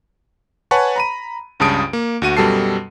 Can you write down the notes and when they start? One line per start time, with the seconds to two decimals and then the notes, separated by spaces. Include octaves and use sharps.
0.71 B4 C#5 F#5 G#5 A5 C#6
0.96 A#5 B5 D#7
1.60 C#2 G2 C#3 A5 D#6 D7
1.93 A#3
2.22 D2 F#4 D#7
2.37 F#2 B2 G3 A4 A5 C7